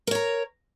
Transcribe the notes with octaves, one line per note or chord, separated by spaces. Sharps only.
A#4 C#5 A#5